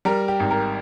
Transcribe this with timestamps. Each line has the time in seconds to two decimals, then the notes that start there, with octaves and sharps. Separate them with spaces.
0.05 G3 A#4
0.28 G4
0.40 G#1
0.51 A#4